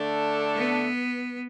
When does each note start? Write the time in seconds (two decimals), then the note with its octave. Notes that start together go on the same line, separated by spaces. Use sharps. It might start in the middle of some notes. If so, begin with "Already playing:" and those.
Already playing: D3 A3 D4 A4
0.55 B3